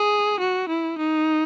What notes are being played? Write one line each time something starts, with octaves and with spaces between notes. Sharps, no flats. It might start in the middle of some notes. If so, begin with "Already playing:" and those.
Already playing: G#4
F#4
E4
D#4